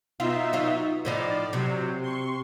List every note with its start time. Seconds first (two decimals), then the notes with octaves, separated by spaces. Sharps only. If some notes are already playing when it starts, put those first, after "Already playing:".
0.20 B2 D#4 F4 E5
0.53 F#3 F4
1.05 A2 F3 D#4 D5
1.53 C3 F#3
2.02 C6 C#6